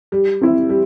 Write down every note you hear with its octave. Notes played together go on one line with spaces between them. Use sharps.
G3
C4 E4
G3